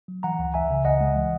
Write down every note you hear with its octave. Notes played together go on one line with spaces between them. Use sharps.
F#3
E3 F#5 A#5
C#2
C#2 E5 G#5
C#3
C#2 D#5 F#5
G#3
E3